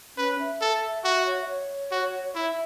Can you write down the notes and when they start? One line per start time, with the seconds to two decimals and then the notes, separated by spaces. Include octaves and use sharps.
0.17 C#4 B4
0.39 E5
0.61 A4
1.04 F#4 E5
1.26 C#5
1.42 E5
1.48 C#5
1.92 F#4
2.35 E4 E5